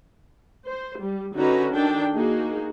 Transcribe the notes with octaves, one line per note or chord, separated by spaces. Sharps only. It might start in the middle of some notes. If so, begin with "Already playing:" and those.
C5
G3
D3 C#4 D#4 F#4 B4 A#5
D#3 D4 A4 G5
A#3 D#4 F#4 G#4